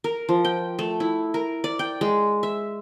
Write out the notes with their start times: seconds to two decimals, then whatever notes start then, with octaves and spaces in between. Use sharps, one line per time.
0.04 A#4
0.29 F3
0.45 G5
0.79 A3
1.00 E4
1.34 A#4
1.64 D5
1.79 G5
2.01 G#3
2.43 E5